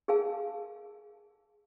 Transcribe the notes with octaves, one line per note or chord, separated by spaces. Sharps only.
G#4 A#4 F5 G#5 A5